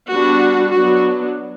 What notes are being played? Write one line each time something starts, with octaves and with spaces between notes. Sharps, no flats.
G3 B3 D4 F#4
F#3 B3 D4 F#4